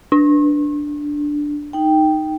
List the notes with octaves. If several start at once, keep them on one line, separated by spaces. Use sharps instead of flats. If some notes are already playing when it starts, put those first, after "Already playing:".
D4
D#4 G5